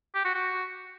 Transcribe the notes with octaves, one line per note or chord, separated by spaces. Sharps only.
G4
F#4
F#4